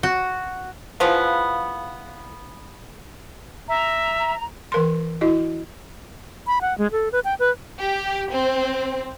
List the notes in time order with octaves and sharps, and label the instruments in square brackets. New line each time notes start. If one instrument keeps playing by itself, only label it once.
[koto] F#4
[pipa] C#3 E3 F3 B3
[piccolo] E5 [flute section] A#5
[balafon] E3 A#4 C6
E4 F#4 D#5
[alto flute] B5
F#5
G#3
A4
B4
G5
B4
[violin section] G4
C4